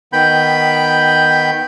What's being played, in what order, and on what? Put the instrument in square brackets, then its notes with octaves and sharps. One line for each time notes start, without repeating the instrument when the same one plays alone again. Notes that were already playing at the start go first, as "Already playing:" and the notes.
[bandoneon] D#3 B3 G5 B5 G6